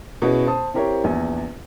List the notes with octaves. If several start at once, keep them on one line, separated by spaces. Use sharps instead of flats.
B2 B3 C#4 E4 G#4
C5 A5 D#6
C4 E4 G4 A#4 C5 C#5
A#1 E2 G#5